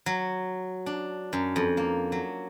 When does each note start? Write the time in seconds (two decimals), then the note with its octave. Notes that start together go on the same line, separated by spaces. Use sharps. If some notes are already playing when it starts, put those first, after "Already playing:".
0.06 F#3
0.86 D4
1.33 F#2
1.56 F2
1.77 A#3
2.12 F#3